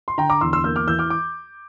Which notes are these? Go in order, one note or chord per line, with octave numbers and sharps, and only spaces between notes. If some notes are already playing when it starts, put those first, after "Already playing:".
C6
D3 G5 A#5
A#5 D6
E2 C6 E6
C6 E6
A#3 E6 G6
D6 F6
E3 E6 G6
D6 F6
D6